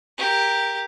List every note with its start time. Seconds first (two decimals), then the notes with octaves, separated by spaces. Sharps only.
0.18 G4 A#4